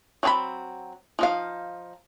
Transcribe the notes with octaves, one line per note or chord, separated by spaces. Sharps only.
F#3 C4 G#4 A5 B5
F3 D#4 F5